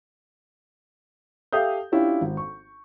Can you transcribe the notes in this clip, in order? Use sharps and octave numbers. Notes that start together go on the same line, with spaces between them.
G4 A4 E5 F5 D#6 G6
C#4 D4 E4 F4 G4
G#1
C#6